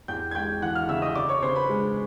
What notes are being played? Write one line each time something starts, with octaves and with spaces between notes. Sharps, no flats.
E2 G5 G6
G#6
G#3 G5 G6
E3 F#5 F#6
F5 F6
C#3 E5 E6
D#5 D#6
C#3 D5 D6
C#5 C#6
C#3 C5 C6
B4 B5
G#3